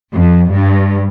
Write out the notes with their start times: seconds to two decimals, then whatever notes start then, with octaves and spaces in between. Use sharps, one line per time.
0.14 F2
0.52 G2